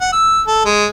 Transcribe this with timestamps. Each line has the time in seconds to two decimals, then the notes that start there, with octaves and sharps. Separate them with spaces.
0.01 F#5
0.13 E6
0.47 A4
0.65 G#3